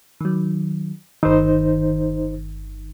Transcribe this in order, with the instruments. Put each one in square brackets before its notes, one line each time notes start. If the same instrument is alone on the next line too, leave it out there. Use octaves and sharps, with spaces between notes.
[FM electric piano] D#3 F#3
[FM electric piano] G1 D#3 [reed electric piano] D#4 C5